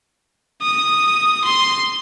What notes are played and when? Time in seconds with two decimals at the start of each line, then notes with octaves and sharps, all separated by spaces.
0.62 D#6
1.44 C6